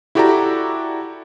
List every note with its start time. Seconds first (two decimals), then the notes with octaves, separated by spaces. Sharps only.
0.15 E4 F#4 G4 A4 D5 A#5